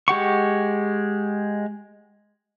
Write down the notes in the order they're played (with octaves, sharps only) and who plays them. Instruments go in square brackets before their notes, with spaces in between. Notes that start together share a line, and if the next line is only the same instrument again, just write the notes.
[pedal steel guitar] G#3 G4 F#5 C#6